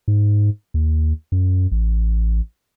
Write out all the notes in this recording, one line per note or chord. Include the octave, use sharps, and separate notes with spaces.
G#2
D#2
F#2
A1